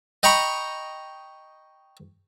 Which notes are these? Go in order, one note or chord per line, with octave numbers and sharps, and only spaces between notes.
D#5 G5 A#5 B5 C#6